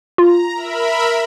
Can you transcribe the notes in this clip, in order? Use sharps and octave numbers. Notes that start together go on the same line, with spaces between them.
F4 A#5
A#4 E5 B5